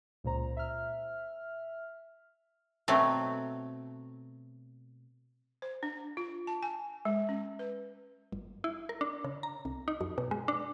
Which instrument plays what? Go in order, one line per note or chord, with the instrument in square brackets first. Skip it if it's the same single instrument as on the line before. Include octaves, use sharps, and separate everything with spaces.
[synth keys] C#2 A#2 C5 A#5
E5 F6
[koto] B2 F#3 A3 C4
[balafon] C5
D4
F4
A5
G#5
G#3
C#4
B4
[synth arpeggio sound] G1
E4
A#4
D4
C#3
A#5
C2
D#4
F#2
B2
G#3
D4